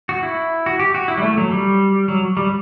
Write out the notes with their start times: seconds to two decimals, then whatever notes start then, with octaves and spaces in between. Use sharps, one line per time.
0.09 F#4
0.23 E4
0.66 F#4
0.79 G4
0.95 F#4
1.08 E4
1.18 G3
1.23 A3
1.37 F#3
1.52 G3
2.08 F#3
2.37 G3